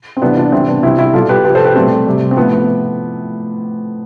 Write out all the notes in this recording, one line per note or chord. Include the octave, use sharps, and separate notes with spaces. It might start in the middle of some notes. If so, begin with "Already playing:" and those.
C4
C3 E3 G3 B3 D4
D4 F4
C3 E3 G3 C4 E4
B3 D4
C3 G3 C4 E4
E4 G4
B2 G3 F4 A4
G4 B4
C3 F3 G4 B4
A4 C5
G4 B4
B2 G3 A3 C4
C3 G3
C4
A2 F3 B3
B3